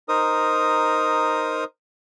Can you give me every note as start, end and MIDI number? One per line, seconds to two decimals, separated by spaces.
0.09 1.64 63
0.09 1.64 70
0.09 1.64 72
0.09 1.64 87